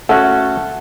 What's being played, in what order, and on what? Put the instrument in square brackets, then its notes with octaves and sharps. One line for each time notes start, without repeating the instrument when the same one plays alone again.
[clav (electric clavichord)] A3 C#4 F#4 [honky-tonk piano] A4 [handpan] E5 F#5